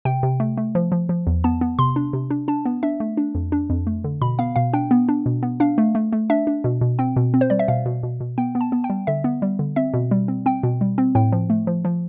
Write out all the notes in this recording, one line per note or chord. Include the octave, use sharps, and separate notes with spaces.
C3 G5
C3
A3
A3
F3
F3
F3
E2
B3 A5
B3
C3 C6
D4
C3
D4
D4 A5
B3
D4 E5
A3
D4
F2
D4
F2
A3
D3
B2 B5
B3 F5
B2 F5
D4 G5
B3
D4
B2
B3
D4 F5
A3
A3
A3
D4 E5
D4
B2
B2
C4 G5
B2
C4
C5
G3 D5
E5
B2 F5
B2
B2
B2
B3 G5
B3
A5
B3
G5
G3
D3 E5
B3
G3
D3
C4 E5
B2
G3
C4
C4 G5
B2
G3
C4
A2 G5
F3
A3
F3
F3